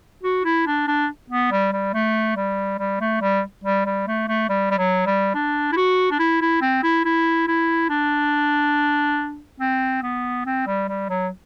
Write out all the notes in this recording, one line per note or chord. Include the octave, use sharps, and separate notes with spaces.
F#4
E4
D4
D4
B3
G3
G3
A3
G3
G3
A3
G3
G3
G3
A3
A3
G3
G3
F#3
G3
D4
E4
F#4
D4
E4
E4
C4
E4
E4
E4
D4
C4
B3
C4
G3
G3
F#3